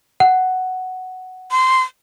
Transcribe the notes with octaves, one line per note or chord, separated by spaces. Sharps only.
F#5
C6